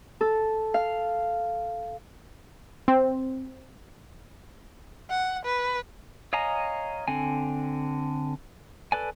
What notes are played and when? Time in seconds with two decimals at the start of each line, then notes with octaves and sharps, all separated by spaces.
0.21 A4
0.74 F5
2.88 C4
5.10 F#5
5.45 B4
6.33 C#5 D#5 F5 G#5 A#5
7.08 D3 C4 G#5
8.92 A4 B4 D5 G#5